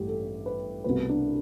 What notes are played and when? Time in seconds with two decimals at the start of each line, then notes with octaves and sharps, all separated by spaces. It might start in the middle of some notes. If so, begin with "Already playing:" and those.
Already playing: A1 G2 A3 G4
0.08 A4
0.46 B4
0.84 C2 B2 A3 B4
1.09 D4